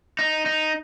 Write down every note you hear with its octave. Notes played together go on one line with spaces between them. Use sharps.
D#4
D#4